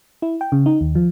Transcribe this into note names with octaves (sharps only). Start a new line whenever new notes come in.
E4
G5
C#3
D#4
D#2
F3